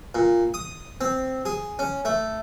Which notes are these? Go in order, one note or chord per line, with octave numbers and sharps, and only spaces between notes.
A#2
D#6
C4
G#4
C#4
A3